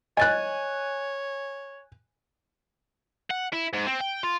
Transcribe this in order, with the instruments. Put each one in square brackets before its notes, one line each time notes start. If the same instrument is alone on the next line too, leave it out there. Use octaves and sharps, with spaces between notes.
[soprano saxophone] C#5 [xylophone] D#5 A6 [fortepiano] G#5 F#6
[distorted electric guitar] F#5
E4
G#2
C4
G5
F4